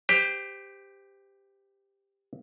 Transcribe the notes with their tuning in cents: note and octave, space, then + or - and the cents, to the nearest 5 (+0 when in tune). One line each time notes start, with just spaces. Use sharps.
G4 +10 C5 -30